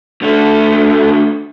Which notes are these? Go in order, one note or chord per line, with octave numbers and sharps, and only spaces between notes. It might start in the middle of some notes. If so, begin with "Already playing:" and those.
D3 A3